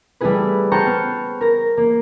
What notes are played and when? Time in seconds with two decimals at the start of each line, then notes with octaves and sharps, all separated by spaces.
0.21 G3 A3 B3 E4 G#4 B4
0.72 C5 F#5 G5 A5 A#5 C#6
0.86 B3 F6
1.41 A#4 A#6
1.77 A#3